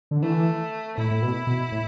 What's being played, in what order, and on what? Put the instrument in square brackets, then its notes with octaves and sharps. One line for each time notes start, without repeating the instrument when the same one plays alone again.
[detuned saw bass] D3
[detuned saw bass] E3 [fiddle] A3
[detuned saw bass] A2 [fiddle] E4
[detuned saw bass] A2
B2
B2
A2